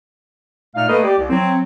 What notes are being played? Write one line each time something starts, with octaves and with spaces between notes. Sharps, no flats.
A#2 A3 D#4 F5 F6
A3 A#3 A4 B4 D#5
G4 D5
C2
F#3 C4